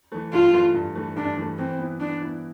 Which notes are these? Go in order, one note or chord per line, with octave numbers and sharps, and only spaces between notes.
E3 A3
G2 F4
E3 A3
G2
E3 A3
G2 D4
E3 A3
E3 C4
B3 E4
E3 D4
B3 E4